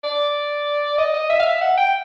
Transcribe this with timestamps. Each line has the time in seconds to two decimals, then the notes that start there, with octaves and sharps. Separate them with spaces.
0.04 D5
0.98 D#5
1.14 D#5
1.30 E5
1.39 F5
1.46 E5
1.61 F#5
1.77 G5